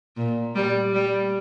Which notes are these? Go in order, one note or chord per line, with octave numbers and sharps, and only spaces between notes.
A#2
G3
G3